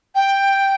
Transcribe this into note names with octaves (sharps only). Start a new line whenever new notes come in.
G5